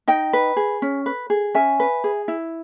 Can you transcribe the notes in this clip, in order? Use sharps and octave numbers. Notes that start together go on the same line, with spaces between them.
D#4 D#5 G5
B4
G#4
C#4
B4
G#4
C#4 E5 G#5
B4
G#4
E4